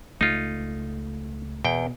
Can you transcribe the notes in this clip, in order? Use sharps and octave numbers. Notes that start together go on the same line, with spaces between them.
C#2 A3 D#4 F4
E2 B2 G5